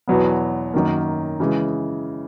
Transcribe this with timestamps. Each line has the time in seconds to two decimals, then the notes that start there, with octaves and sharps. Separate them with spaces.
0.08 E2 B2 F#3 B3
0.74 F#2 D#3 F#3 A#3
1.40 C#3 E3 G#3